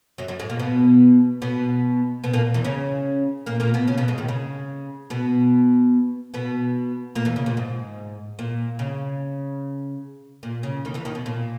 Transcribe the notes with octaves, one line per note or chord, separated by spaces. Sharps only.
F#2 F#3
F#2 F#3
G#2 G#3
A#2 A#3
B2 B3
B2 B3
B2 B3
A#2 A#3
E2 E3
C#3 C#4
A#2 A#3
A#2 A#3
B2 B3
C#3 C#4
B2 B3
G#2 G#3
D#2 D#3
C#3
B2 B3
B2 B3
A#2 A#3
E2 E3
C#3
A#2
G#2
A#2
C#3
A#2
C#3
D#2 D#3
E2 E3
D#2 D#3
B2
A#2